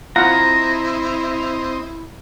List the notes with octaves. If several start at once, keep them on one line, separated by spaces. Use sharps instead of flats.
C4 E4 F4 D#5 F5 F#5 A#5